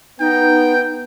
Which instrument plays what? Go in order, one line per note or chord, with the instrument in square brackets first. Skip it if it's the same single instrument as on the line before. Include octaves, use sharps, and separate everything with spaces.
[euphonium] B3 [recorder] D#4 [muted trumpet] G5